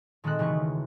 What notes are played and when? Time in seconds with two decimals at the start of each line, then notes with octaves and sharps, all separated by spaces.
0.24 A#2 D#3 G#3 C4 A4 F#6
0.39 E1 C#3 E3 A3 A#3 C#6